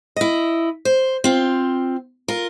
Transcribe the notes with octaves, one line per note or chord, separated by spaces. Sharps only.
E4 D#5
C5
C4 F4
F4 A#4